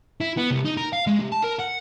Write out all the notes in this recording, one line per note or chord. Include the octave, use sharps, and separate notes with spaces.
E4
B3
C2
D#4
A#4
F5
G#3
C3
A5
A#4
F#5